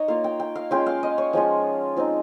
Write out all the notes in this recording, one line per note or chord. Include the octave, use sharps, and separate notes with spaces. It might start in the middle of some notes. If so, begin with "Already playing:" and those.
Already playing: D#4 C#5 D#5
A#3 F4 F5
G5
G5
F5
G#3 C#4 F4 G5
F5
D#5
C#5
F3 G#3 C#4 F4
F3 C4 D#4